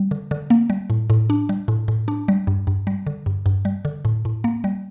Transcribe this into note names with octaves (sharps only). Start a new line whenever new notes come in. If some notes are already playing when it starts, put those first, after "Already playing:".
Already playing: G3
D3
D3
A#3
G3
A2
A2
D4
G3
A2
A2
D4
G3
G2
G2
G3
D3
G2
G2
G3
D3
A2
A2
A#3
G3